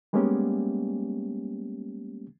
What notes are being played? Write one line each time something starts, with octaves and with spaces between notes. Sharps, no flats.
G3 G#3 A#3 B3 C#4 G4